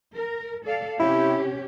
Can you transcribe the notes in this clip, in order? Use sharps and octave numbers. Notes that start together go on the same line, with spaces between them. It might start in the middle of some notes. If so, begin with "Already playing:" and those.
A#4
A4 D5 F5
C3 C#4 E4 G4